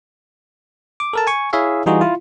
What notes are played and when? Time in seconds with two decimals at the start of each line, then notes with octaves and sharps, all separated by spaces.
1.00 D6
1.13 A4 A#4 A5
1.27 G#5 C#6
1.53 E4 G#4 C#5 E5 F5
1.86 E3 G3 D#4 F4 F#4 G#4
2.01 E4 F4